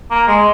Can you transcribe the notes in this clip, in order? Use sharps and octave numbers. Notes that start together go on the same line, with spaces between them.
A#3
G#3